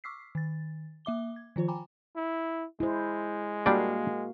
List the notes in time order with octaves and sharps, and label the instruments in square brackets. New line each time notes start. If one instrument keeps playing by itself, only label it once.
[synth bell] C#6 D6 E6 F6 B6 C7
D#3 A6
A#3 E5 D6 G7
G#6
D#3 F3 F4 C5
G5 G#5 A#5 B5 D6
[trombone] E4
[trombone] G#3 [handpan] E4 C5
[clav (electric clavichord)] G3 D4 D5 [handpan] A#3 F#4 F5